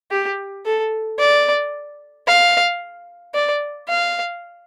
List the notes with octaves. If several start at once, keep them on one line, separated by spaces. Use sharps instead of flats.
G4
A4
D5
F5
D5
F5